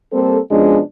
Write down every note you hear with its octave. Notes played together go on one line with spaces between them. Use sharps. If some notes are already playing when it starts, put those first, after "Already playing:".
G3 A#3 C4 A4
B2 F3 G#3 C#4 D4